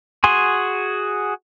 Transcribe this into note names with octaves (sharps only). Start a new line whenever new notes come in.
F#4 G#4 G#5 C6